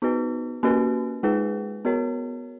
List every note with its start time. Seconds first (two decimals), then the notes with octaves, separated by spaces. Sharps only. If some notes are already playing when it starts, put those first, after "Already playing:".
0.02 B3 D#4 F#4 B4
0.63 A#3 C#4 F#4 B4
1.23 G#3 D#4 G#4 B4
1.85 B3 F#4 A#4 C#5